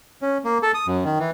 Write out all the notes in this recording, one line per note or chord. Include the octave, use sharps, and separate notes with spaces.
C#4
A#3
A4
D#6
F#2
D#3
E3